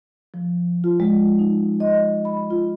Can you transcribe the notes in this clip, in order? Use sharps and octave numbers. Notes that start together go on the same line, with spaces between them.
F3
F4
G#3
D#4
D#5
B5
F4